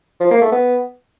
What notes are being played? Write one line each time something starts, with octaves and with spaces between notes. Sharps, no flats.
F3
A#3
A3
B3